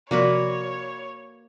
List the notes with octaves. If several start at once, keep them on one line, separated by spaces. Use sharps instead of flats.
C3 F3 A#3 F#4 B4 C#5 D5